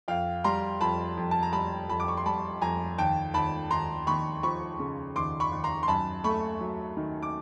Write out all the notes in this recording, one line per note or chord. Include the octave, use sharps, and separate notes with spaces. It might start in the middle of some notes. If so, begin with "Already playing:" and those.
F2 F5 G5
G3 A#5 C6
F2 A5 B5
F2
A5
A#5
G3 A5 B5
F2 A5 B5
D6
C#6
C6
G3 A5 B5
F2 G#5 A#5
D#2 G5 A5
D#2 A5 B5
D#2 A#5 C6
D#2 B5 C#6
F3 B5 C#6
C#3
D#2 C6 D6
B5 C#6
D#2
A#5 C6
C6
F#2 A5 B5
A3 B5 C#6
F#3
D#3
D6